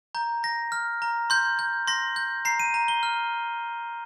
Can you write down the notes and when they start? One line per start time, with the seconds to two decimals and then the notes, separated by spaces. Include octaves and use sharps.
0.15 A#5 G6
0.43 A#5 A#6
0.72 F6
1.02 A#5
1.30 C6 G6
1.59 G6
1.87 C6 A#6
2.16 G6
2.45 A#5 C7
2.59 D#7
2.74 A#5
2.88 G7
3.03 F6